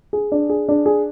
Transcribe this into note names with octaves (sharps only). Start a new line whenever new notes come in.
G#4
D4
G#4
D4
G#4